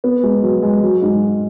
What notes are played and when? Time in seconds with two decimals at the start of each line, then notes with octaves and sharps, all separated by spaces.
0.04 B3
0.23 G#3
0.43 F#3
0.63 G#3
0.83 F#3
1.02 G#2